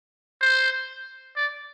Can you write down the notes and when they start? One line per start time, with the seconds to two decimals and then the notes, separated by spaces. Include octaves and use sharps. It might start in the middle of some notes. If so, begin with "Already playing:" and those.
0.41 C5
1.36 D5